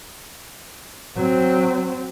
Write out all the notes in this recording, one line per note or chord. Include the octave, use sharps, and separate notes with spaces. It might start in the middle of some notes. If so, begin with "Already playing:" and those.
F#3 C4